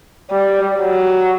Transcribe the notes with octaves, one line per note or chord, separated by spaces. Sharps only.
G3
F#3